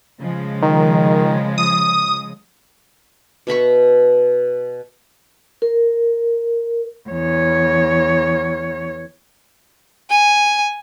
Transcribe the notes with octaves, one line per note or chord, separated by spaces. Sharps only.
C#3 F3 G#3
D#3
D#6
B2 E5 B5 C#6
A#4
E2 C#5
G#5